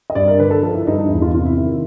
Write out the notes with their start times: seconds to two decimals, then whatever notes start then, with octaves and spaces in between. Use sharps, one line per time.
0.10 D#5
0.15 G2 D5
0.28 A#4
0.40 D3 B4
0.51 A4
0.63 F3 A4
0.75 E4
0.87 G2 D#4
0.99 D#4
1.10 E2 E4
1.22 F4
1.34 C3 F4
1.46 E4
1.57 D#3 E4